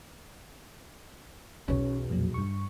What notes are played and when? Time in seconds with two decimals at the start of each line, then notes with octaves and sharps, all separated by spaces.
1.68 B1 E2 C#4 C#5
2.10 F2 A#2 F#3
2.34 G2 C#6